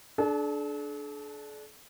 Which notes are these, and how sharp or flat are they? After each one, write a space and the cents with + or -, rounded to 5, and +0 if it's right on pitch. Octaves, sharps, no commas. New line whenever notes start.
D4 +0 A4 -45